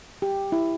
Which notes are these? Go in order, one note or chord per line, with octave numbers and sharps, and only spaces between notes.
G4
E4